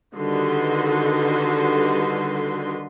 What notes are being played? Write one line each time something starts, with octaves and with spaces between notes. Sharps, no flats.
D3 D#3 G3 F#4 B4 C6